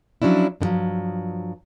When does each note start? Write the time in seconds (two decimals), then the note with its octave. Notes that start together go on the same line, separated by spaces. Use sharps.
0.22 F3 F#3 C#4 D4 E4
0.61 G2 D3 D#3 F3 F#3